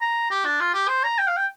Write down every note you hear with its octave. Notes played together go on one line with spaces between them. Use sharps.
A#5
G4
D4
F4
G4
C5
A#5
G5
F5
G5